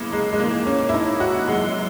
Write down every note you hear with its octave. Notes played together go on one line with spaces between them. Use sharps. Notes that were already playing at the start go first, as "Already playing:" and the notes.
Already playing: F#2 C#3 E3 A#3 B3
G#3
G#3
G#2 E3 A#3
C#4
E4
D#4
F#4
F#2 E3 G#3